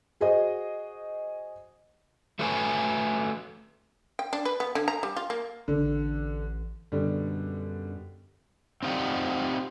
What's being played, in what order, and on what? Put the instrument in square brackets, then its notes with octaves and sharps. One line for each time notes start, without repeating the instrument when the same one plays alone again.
[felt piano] F#4 G#4 C5 D#5
[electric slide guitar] A3 F#4 A4 B4 C#5 G#5
[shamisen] G5
D4
B4
B3
D3
A#5
G3
F4
A#3
[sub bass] A1 [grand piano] D3
[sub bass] F#2 [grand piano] B2 D3 G3
[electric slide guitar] C4 D#4 F4 G4 D5 F#5